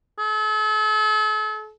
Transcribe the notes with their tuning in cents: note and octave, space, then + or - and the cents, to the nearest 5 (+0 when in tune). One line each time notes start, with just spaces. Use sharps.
A4 -40